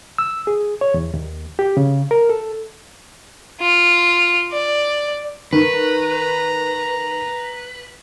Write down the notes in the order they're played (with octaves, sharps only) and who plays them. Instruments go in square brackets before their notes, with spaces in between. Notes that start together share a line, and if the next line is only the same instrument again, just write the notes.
[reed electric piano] E6
G#4
C#5
E2
D#2
G4
C#3
A#4
A4
[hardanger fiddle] F4
D5
[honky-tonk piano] D#3 [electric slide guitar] B4 [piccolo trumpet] A#5